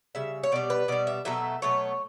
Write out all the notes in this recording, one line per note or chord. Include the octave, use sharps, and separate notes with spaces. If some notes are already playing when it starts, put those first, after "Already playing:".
C#3 G3 E5
C#5
B2 G3 D5
B4
B2 G3 D5
E5
B2 F#3 A3 E5
B2 F#3 A3 C#5